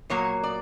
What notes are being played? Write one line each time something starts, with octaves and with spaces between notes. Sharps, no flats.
A#2 F#3 A#3 C#5
D5